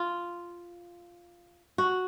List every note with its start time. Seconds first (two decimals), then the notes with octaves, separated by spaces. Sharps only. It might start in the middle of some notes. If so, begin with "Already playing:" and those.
Already playing: F4
1.78 F#4